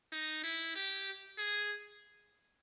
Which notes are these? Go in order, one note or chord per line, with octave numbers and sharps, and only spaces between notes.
D#4
E4
G4
G#4